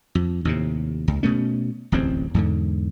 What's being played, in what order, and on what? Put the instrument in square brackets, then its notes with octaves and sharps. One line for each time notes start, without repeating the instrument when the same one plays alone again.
[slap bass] F2
D#2 A2 C3
C#2
B2 A3 C#4
D1 A1 E2 C4
E2 G#2 D3